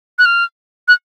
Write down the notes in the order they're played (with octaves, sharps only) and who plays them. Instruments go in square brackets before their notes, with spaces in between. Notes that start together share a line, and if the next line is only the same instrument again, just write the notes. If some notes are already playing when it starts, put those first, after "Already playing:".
[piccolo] F#6
F6
F#6